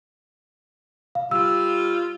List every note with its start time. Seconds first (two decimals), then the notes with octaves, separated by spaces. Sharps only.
1.15 F5
1.31 G3 F4 E6